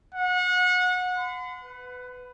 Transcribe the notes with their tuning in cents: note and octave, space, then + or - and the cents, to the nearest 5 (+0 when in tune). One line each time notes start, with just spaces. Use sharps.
F#5 -30
B5 +45
B4 +15